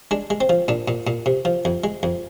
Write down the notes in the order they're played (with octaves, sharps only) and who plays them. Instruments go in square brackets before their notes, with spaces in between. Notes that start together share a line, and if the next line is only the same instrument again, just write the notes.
[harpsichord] G#3 D4
G#3
C4
F3
A#2 D4
A#2
A#2
C3
F3
F2
G#3
F2